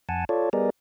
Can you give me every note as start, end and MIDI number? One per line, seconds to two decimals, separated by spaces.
0.09 0.25 41
0.09 0.25 78
0.09 0.25 80
0.09 0.25 81
0.29 0.49 65
0.29 0.49 69
0.29 0.49 73
0.29 0.49 74
0.53 0.70 55
0.53 0.70 59
0.53 0.70 68
0.53 0.70 70
0.53 0.70 74
0.53 0.70 75